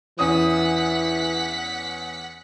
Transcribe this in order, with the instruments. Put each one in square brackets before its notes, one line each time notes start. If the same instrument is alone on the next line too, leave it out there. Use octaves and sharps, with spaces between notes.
[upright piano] E2 C#4 D#6 [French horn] E3 [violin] F#5 B6